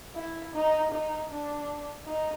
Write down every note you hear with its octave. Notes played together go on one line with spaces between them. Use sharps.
E4
D#4
D#4
D4
D#4